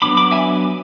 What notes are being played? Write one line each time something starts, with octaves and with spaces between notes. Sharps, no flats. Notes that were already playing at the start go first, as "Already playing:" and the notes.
F#3 B3 D4 B5 D6
B5 D6
E5 G#5